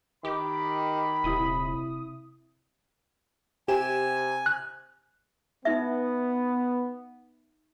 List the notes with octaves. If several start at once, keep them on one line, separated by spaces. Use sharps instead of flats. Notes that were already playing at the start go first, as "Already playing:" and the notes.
D#3 G4 B5 D6
D#1 C3 E4 D#6
C3 G4 G#5 E7
F#6
B3 D#4 E5